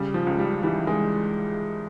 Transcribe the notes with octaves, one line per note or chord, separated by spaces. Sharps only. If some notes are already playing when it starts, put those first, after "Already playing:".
Already playing: C#3 G3
F3
C#2
G3
E3 G3
G#3